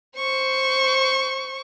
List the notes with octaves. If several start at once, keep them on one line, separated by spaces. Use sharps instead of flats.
C5 C#6